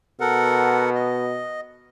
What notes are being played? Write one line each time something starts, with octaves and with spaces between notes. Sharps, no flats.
B2 A4 A#4 F#5
D#5